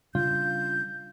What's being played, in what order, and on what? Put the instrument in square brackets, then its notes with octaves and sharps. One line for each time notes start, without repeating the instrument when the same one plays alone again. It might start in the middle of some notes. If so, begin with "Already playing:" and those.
[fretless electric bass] C#3 G3 D4 [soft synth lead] F4 [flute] G6